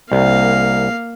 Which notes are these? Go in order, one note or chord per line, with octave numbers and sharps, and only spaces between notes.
C2 A#3 F5